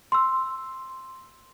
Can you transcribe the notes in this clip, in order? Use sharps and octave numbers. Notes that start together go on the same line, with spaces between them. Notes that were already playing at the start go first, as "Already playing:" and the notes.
C6 E6